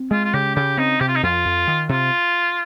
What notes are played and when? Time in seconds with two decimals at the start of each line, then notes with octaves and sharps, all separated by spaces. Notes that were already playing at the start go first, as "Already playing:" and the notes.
Already playing: C4
0.11 G#3 F4
0.24 F4
0.33 C#3 G4
0.56 C#3 G4
0.78 C4 D#4
1.00 C3 G4
1.08 F4
1.16 D#4
1.23 F2 F4
1.45 F2
1.68 D#3
1.89 C3 F4